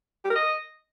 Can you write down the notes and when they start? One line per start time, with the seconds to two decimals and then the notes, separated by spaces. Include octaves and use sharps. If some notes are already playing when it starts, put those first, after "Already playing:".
0.24 G4
0.30 A#4
0.35 D#5